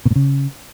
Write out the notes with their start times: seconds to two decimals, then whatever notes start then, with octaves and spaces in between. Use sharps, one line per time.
0.05 B2
0.11 A2
0.16 C#3